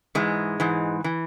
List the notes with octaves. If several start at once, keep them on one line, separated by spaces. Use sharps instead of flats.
G#2 E3 G#3
G#2 E3
E3